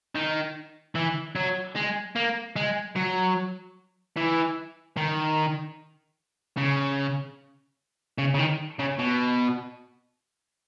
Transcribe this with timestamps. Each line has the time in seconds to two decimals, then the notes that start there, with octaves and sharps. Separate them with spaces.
0.15 D#3
0.95 E3
1.35 F#3
1.76 G#3
2.16 A#3
2.56 G#3
2.96 F#3
4.16 E3
4.97 D#3
6.57 C#3
8.18 C#3
8.34 C#3
8.39 D#3
8.79 C#3
8.99 B2